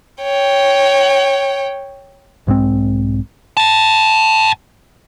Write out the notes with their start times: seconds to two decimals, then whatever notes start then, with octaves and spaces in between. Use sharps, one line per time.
0.22 C#5 G5
2.47 B1 G#2 G#3 C4
3.57 G5 A5